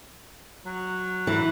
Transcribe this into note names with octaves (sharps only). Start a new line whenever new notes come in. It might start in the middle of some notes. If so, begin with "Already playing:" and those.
F#3
E3